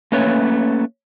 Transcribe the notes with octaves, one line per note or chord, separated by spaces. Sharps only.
A3 A#3 C#4 B4 C#5